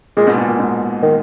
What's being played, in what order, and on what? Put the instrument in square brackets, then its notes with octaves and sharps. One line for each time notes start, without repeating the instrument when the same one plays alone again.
[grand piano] A#2 [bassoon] G#3
[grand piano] G#2 B2
A#2
A#2
G#2 B2
[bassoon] D#3